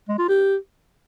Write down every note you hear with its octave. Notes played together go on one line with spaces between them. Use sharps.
G#3
F4
G4